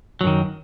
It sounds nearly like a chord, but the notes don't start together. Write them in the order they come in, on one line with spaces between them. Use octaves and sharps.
F#3 F#2 D#3